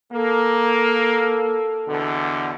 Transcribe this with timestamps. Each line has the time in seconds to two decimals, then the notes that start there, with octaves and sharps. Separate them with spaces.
0.12 A#3 A4
1.88 E2 B2 D3